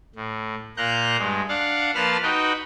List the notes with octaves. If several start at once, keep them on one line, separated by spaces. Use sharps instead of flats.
A2
A#2 A#3 A#5 F#6 G6
G2 G#3
D4 F5 F#5
F3 A#3 B4 A5 B5 F6
D#4 F#4 B4 D#5 G5